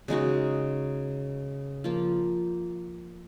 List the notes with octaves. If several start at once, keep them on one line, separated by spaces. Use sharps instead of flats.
C#3 G#3 D#4 F#4
F3 A#3 F4